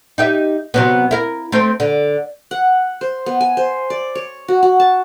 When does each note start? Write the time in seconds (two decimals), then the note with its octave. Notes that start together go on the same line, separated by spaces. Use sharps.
0.18 D#4 G4 E5
0.74 C3 F#3 B3
1.11 E4 A#4
1.52 A3 C4 C5
1.80 D3
2.51 F#5
3.01 C5
3.26 B3
3.41 G#5
3.57 C5
3.90 D5
4.15 C#5
4.48 F#4
4.63 F#4
4.80 A5